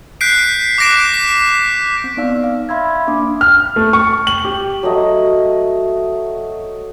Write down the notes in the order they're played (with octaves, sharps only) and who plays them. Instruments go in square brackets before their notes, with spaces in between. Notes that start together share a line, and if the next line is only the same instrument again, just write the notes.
[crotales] F#6 G6 B6 C7 D7
D6 F#6 A#6 D7 E7
B6
[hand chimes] C4
B3 D#4 D5 F5 E6
F5
E5 F5 B5 C6 E6 G#6
B5
A#3 D4 D6 D#6
[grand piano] F6
A3
C#6
F#7
G4
[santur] F#3 A3 D#5 E5